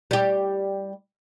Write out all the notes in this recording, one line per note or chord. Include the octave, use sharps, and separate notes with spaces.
G3 G4